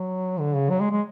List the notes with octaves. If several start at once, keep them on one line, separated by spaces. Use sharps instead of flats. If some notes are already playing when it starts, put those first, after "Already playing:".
Already playing: F#3
D3
C#3
F#3
G#3
G#3